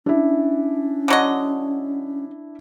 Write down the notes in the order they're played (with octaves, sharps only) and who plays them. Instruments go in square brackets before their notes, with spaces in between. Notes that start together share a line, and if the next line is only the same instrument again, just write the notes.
[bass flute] C#4 [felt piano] D4 E4
[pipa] D3 F#3 D#5